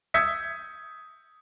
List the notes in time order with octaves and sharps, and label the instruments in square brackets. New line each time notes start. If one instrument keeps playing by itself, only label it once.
[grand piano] D#6 E6 G6 G#6 B6 C#7